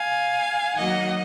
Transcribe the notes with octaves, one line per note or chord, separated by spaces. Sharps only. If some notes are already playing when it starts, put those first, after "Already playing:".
Already playing: F5 G#5
D#3 F#3 A#3 D#5 F#5